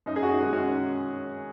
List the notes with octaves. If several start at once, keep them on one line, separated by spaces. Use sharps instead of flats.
F#2 D#4
G#4
F#4
D#4
D#3 G#3
C#4 F#4